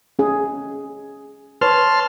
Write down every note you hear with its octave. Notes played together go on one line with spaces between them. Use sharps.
C#4 G#4
B4 C#5 A5 C6 F6